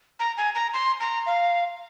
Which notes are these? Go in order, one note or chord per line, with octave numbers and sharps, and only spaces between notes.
A#5
G#5
A#5
C6
A#5
F5